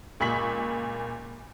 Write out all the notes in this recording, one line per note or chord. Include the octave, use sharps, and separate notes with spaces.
C#2 A#2 B5 C#6 B6 F#7